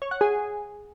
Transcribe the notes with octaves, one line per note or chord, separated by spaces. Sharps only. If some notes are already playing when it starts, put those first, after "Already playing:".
C#5
F#5
G#4